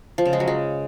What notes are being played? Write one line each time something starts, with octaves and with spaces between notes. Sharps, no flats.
F3
C#3
G#3
F#3
G#3